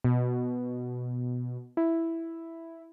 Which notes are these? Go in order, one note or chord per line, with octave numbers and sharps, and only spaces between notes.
B2
E4